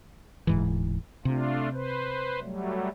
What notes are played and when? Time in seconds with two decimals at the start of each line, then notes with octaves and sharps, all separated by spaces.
0.47 D1 G#2 E3
1.25 C3 A3 D4 F4
1.73 B4 C5
2.40 F#3 G3 A3